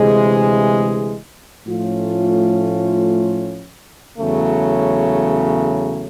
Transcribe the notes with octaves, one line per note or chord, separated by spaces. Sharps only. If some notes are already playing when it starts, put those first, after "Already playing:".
Already playing: D2 C3 E3 G#3
A2 F3 A3 C#4 F4
E2 C#3 F#3 A3